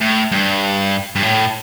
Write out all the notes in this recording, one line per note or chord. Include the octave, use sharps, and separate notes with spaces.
A2
G2
G2
A2